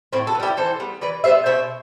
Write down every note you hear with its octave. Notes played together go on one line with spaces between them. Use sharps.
A2 C4 E4
F#4 A4
B3
G3 E4 G4
E3 A4 C5
G3 B3
E3 B4 D5
G3 B3 C5 E5
B2 C5 E5